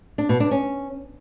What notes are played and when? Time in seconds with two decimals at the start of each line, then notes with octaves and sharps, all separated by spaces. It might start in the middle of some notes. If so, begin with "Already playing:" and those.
0.18 D4
0.29 B2
0.40 D4
0.51 C#4